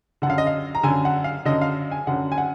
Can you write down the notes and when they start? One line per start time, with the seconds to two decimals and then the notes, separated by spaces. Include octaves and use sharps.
0.22 D3 F#5
0.26 F#2 F5
0.38 D#5
0.47 F5
0.75 A#5
0.83 F#2 D3 G#5
1.05 F#5
1.24 F5
1.45 F#2 D3 D#5
1.61 F5
1.91 G#5
2.07 F#2 D3 F#5
2.32 G#5
2.38 F#5